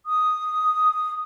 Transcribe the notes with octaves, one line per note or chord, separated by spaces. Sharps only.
D#6